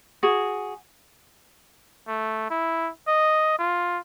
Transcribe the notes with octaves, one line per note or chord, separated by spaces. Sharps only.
F#4 G#4
A3
E4
D#5
F4